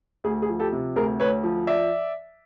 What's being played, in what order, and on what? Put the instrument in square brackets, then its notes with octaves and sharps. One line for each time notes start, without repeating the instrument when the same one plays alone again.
[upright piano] D2 G#4
G#4
F3
G4 A4
C3
D2 G#4 A#4
D2 B4 C#5
F3
D5 E5